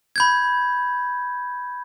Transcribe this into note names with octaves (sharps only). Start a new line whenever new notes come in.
B5 G6 G#6